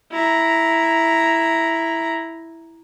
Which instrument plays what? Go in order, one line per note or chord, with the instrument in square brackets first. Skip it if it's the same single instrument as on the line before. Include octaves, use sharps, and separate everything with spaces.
[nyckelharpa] E4 A#5